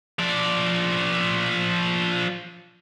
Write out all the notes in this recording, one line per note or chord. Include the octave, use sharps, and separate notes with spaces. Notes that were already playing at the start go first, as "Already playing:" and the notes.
F3 D5